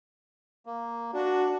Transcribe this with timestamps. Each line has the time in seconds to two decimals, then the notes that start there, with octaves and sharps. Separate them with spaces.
0.66 A#3
1.14 D4 F#4